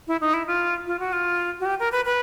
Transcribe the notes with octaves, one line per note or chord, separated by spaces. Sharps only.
E4
D#4
E4
F4
F4
F#4
F4
F#4
G4
A#4
B4
B4